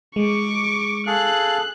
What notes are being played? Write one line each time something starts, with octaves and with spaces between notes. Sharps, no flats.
G#3 C#6 D6
G#4 A4 F5 F#6